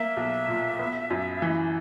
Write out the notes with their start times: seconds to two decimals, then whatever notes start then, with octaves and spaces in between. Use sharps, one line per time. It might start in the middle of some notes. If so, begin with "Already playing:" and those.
Already playing: A#3 E5
0.17 B1
0.48 A#2
0.79 B3
1.10 F#2
1.42 E3